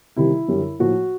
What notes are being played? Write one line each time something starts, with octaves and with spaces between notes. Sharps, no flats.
C3 D#3 G3 E4
F#2 D3 G3
A2 F3 A#3 F#4